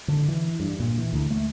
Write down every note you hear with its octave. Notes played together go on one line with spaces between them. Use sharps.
D3
E3
G2
A#2
E3
D2
A3